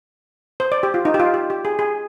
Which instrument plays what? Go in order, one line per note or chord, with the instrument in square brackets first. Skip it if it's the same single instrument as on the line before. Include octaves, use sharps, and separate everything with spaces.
[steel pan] C5
D5
G4
F4
D#4
G4
F4
G4
G4
G#4
G#4